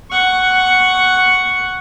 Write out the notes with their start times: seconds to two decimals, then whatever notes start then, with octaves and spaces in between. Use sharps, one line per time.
0.11 F#5 C#6